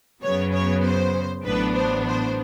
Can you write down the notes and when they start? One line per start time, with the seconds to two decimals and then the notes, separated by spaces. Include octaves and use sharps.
0.23 F#2 C#3 F#3 B3 C#5
0.53 C#5
0.84 C5
1.45 A1 A2 F#3 B3 D4 B4
1.76 C5
2.07 C5